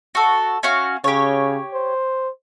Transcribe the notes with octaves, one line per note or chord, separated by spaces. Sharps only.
F#4 A4
C#4 F#4 F5
C#3 G4 C#5
C5